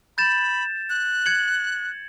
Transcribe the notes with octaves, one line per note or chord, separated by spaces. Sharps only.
B5 G6 A6 E7
F#6
G#6 C#7 F#7